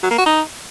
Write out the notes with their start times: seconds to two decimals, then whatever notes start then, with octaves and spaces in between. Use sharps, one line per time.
0.03 F#3
0.11 A#3
0.18 F#4
0.26 D#4